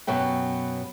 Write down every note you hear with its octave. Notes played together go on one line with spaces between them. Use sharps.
F#2 B2 F#3 B4 G5